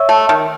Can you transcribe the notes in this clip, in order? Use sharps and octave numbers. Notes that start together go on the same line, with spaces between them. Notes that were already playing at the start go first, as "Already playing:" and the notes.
Already playing: C#5 E5
A3
D#3